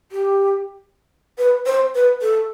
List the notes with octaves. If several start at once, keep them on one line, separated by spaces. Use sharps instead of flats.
G4
B4
C5
B4
A4